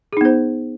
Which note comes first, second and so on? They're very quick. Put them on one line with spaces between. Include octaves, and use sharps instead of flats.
G#4 D#4 B3 C5